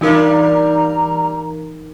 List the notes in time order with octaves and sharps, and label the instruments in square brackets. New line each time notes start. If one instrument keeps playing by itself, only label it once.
[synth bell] E3 D#4 A#4 [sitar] G3 A#3 D4
[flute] A#5